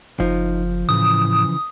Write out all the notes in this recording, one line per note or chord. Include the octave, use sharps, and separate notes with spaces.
F#1 F3 D#4
A2 C#3 E3 D#6